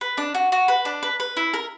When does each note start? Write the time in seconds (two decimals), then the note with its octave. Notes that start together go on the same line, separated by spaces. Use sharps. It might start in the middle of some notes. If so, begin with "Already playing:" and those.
0.01 B4
0.17 D4
0.35 F#4
0.52 F#4
0.68 B4
0.85 D4
1.03 B4
1.20 B4
1.37 E4
1.54 A#4